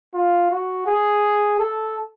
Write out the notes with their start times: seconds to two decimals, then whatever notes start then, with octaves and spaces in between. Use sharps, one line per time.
0.14 F4
0.51 F#4
0.87 G#4
1.59 A4